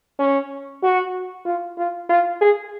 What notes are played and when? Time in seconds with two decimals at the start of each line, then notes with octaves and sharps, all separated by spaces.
0.19 C#4
0.83 F#4
1.45 F4
1.78 F4
2.09 F4
2.41 G#4